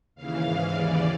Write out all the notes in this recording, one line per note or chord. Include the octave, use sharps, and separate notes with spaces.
D#2 C#3 E3 F5
G#2 E3
D#2 C#3 E3 D5